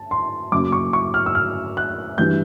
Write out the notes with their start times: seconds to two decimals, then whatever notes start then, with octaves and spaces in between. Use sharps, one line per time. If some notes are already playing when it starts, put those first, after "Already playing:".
Already playing: A5
0.11 C6
0.52 F#2 C#3 F#3 A#3 D6
0.72 C#6
0.93 C#6
1.14 F6
1.26 E6
1.35 F6
1.77 F#6
2.18 G2 E3 G3 G6